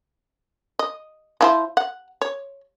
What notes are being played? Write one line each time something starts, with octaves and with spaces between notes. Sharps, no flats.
D#5
F3 E4 C5
F#5
C#5